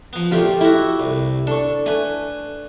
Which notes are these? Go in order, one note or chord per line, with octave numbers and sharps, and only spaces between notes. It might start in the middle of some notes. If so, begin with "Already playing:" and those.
F3 B3
A#1 A3 F4 G4
A3 E4 F#4
C2
D4 A4 C#6
A3 B4 G#5